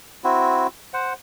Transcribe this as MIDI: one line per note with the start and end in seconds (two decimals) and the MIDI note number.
0.24 0.67 60
0.24 0.67 64
0.24 0.67 66
0.93 1.13 72
0.93 1.13 78